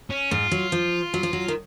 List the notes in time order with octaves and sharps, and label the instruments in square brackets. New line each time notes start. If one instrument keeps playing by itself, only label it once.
[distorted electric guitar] C#4
[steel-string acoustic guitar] G#2 [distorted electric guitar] F4
[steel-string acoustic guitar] F#3
F3
F#3
F3
F#3
D#3